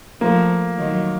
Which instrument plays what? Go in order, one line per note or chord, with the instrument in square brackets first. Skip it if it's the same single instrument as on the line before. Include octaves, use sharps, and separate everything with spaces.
[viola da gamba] F3 A3 [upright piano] A#3
[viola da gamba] D#3 F#3